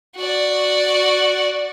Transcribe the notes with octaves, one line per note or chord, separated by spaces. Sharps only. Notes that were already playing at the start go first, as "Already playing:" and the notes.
F#4 D5